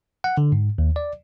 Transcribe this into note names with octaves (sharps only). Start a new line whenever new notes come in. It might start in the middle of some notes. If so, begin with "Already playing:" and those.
F#5
D3
G#2
D#2
D5